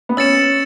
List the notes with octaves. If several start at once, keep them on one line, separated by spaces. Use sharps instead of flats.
B3
C#4 E6 A6 C#7 E7